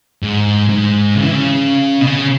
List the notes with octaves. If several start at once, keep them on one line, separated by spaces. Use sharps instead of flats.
G#2
G#2
C#3
E3
C#3
B2
C#3